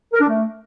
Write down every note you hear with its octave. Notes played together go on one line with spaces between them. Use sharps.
A#4
D4
A3